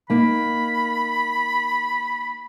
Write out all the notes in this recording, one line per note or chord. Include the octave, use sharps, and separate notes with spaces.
A#3 D#4 B5